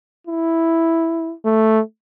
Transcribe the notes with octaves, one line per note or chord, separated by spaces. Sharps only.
E4
A3